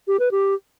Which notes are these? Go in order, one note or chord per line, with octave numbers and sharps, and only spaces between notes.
G4
B4
G4